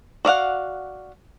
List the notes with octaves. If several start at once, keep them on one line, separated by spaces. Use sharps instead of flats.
F#4 D5 F5 F#5